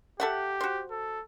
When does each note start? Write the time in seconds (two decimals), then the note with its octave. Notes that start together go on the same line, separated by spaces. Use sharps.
0.20 G4 A4 E5 F#5
0.61 F#4 C5
0.91 A4